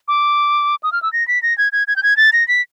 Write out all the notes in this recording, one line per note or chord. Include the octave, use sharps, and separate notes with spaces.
D6
D#6
F6
E6
A#6
B6
A#6
G#6
G#6
G#6
G6
G#6
A6
A#6
B6